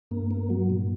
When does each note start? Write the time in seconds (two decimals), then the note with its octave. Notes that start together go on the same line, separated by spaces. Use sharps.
0.11 G2 A#3
0.31 A#3
0.50 F#3
0.70 A#2